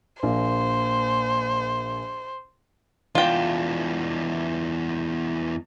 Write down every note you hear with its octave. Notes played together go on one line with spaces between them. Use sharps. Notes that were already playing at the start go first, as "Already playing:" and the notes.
A#1 A#3 C5
E2 D4 F4 G5